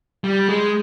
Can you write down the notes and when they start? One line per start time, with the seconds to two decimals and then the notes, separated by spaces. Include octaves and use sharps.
0.24 G3
0.49 G#3